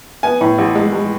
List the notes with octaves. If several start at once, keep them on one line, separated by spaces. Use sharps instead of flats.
B3 G#5
A2
A1
G#3
G#3